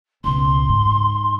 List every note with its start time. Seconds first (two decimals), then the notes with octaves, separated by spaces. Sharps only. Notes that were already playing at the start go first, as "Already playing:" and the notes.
0.24 C#2 B2 C6
0.69 G#2